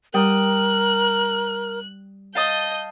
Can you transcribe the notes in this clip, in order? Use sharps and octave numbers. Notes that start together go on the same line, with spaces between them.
G3 A#4 G5 D#6 F#6
D#5 F5 A5 D#6 G6